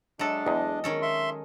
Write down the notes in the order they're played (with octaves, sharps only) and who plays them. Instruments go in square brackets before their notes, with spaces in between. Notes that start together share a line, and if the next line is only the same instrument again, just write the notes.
[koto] F#3 A4 [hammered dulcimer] G#3 E5 [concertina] D4
[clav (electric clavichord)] E2 [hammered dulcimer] D#5
[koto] D#3 C#4 A4
[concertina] E5 C6